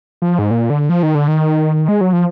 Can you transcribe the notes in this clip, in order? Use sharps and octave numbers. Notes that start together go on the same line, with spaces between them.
F3
G#2
A#2
D3
F3
D#3
D3
D#3
G#3
F#3
F3